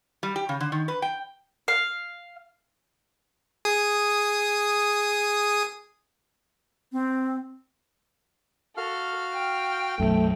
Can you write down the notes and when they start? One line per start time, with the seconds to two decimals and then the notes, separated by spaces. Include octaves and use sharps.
0.23 G3
0.36 G4
0.49 C#3
0.60 D3
0.72 D#3
0.88 B4
1.02 G5
1.68 F5
3.65 G#4 D#6
6.92 C4
8.77 F#4 A4 F5 F6
9.33 G5
10.00 B1 F#2 A3